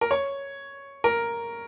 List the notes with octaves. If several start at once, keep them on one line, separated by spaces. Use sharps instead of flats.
A#4
C#5
A#4